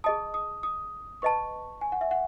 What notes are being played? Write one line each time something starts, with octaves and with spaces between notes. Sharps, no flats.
G#4 D#5 A5 D#6
D#6
D#6
B4 D#5 A5 C#6
G#5
F#5
E5
F#5